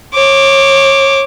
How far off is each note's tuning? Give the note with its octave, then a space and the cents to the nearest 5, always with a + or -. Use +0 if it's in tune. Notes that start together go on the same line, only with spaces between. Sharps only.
C#5 -25 D6 +0